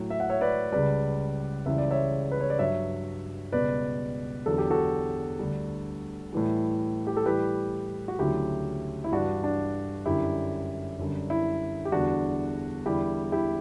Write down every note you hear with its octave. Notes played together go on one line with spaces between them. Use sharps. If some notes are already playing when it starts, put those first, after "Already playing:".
Already playing: A2 F#3
E5
F#5
C#5 E5
B4 D5
C#2 C#3 G3 B4 D5
C#2 C#3 E3 G3 E5
D5
C#5 E5
B4
C#5
D5
G2 F#3 C#5 E5
C#2 B2 G3 B4 D5
E2 D3 F#3 A4
G4
F#4 A4
D2 D3 G3
A2 E3 G3
G4
A4
A2 E3 G3 G4 B4
F#4
D2 C#3 F#3 E4 G4
E4
G2 E3 G3 D4 F#4
D4
F#2 D3 G3 E4 G4
F#2 D3 G3
E4
G4
E2 D3 G3 D4 F#4
E2 D3 G3 E4 G4
E4 G4